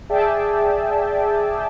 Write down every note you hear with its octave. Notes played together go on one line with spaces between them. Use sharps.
G#4 D5 E5 G5 A5